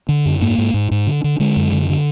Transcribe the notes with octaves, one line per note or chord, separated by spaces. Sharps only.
D3
F#2
G#2 A#3
G#2
G#2
G#2
D3
D3
D3 G#3
F#2
D3
D3